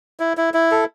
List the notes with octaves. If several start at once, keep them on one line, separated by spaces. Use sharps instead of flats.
E4
E4
E4
A4